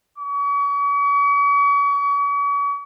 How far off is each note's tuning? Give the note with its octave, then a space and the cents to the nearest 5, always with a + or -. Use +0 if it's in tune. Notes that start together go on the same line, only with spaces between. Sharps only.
C#6 +40